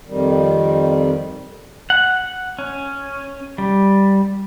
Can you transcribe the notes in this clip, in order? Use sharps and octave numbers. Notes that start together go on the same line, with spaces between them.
F2 D#3 G3
F#5
C#4
G3